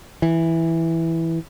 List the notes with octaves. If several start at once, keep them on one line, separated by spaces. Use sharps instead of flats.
E3